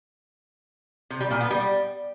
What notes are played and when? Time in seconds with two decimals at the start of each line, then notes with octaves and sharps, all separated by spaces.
1.10 C3
1.20 G3
1.31 A#2
1.41 B3
1.51 G3